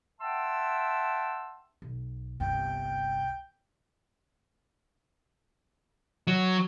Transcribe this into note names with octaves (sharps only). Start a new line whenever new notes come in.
E5 F#5 G5 A5 C6 E6
B1
G1 C2 G5
F#3